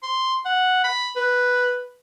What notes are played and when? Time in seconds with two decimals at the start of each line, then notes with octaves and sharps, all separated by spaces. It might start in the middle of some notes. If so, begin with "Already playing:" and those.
0.03 C6
0.45 F#5
0.84 B5
1.16 B4